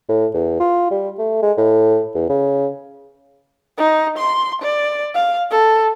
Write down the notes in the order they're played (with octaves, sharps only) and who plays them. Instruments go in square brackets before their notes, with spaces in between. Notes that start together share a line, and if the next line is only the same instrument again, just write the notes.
[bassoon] A2
E2
F4
G3
A3
G#3
A2
E2
C#3
[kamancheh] D#4
C6
D5
F5
A4